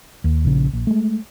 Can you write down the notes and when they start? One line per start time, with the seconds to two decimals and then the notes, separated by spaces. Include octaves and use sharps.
0.24 D#2
0.45 A#1 C#3
0.73 A#1
0.87 G#3 A3